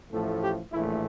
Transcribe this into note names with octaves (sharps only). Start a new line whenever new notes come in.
A1 A2 F3 A3 A4
G4
A#1 A2 E3 A3 E4